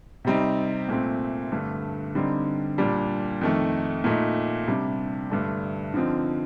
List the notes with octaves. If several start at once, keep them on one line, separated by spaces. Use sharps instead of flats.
C3 G3 C4 D#4
A#2 A3 C4
G2 D3 A3
D3 G3 C4 D#4
A#2 G3 D4
F2 D#3 A3
A#2 A3 D#4
C3 G3 D4
G2 D3 A3 D4
D3 F3 C4 D#4